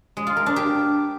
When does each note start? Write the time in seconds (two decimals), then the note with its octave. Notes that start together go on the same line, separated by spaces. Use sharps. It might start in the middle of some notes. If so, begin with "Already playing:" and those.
0.17 G#3
0.27 F4
0.36 A#4
0.46 D4
0.56 G4